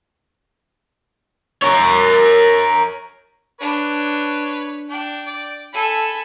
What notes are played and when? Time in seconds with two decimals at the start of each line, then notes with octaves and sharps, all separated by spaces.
1.62 A#4 C#5
3.61 D4 B4 C#5
4.90 D4 G5
5.27 D5
5.73 A4 G#5 B5